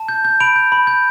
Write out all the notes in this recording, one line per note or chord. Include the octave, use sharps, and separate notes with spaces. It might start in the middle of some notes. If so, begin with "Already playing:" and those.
Already playing: A5
G6
G6
B5 D7 F7
G6
B5
G6